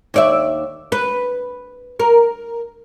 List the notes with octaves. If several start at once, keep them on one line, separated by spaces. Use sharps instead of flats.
D#2 D5 E5
B4
A#4